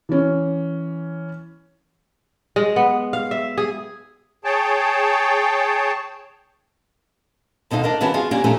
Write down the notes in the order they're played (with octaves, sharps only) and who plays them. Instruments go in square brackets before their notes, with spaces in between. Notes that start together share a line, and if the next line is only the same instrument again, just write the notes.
[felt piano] E3 C#4
[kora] G#3
B3
F5
E5
G#4
[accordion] G#4 C#5 G5 A5
[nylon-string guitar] D2 B2 D3 D#4 F5
D4 A#4 D#5
C#3 E3 B3 C#4 F#4 A5
F4 F#4 G#4 F5
A#3 C#4 D4 F#4 G4
A#2 F3 A3 C#4 D#4 G4